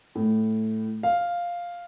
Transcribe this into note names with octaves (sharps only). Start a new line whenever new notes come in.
A2
F5